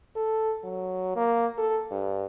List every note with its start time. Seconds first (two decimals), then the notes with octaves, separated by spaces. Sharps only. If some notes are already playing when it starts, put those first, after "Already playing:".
0.16 A4
0.64 F#3
1.16 A#3
1.58 A4
1.91 G2